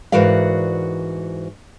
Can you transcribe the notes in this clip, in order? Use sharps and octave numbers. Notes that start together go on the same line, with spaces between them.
G#2 E3 F#4 A#4 D5 F5